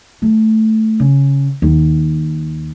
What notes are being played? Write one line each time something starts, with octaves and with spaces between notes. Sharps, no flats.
A3
C#3
D#2